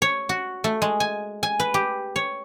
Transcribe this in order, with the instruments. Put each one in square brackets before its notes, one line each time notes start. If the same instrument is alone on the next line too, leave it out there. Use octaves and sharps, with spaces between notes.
[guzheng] C#5
F#4
A3
G#3
G#5
G#5
B4
G4
C#5